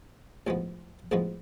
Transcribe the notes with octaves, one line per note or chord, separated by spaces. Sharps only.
A1 G#2 F3 G#3 B3
A1 G#2 F3 G#3 B3